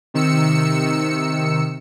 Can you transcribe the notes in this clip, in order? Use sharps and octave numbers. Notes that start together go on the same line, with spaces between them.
C3 D#3 E6 C#7